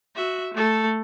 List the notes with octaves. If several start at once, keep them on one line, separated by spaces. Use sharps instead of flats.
F#4 E5
A3 A4